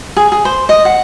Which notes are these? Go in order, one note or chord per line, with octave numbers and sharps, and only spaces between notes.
G#4
G#4
C5
D#5
F#5